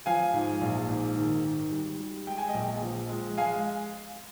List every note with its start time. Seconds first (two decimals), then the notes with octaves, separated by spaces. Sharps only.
0.06 F3 F5 G#5
0.33 G#2
0.61 A#1
0.89 G#2
1.17 D#3
1.45 D#3
1.71 G3
1.99 G3
2.27 G#3 G5
2.38 G#5
2.48 D#5 G5
2.54 A#1
2.82 F3
3.09 G#3
3.37 G#3 F5 G#5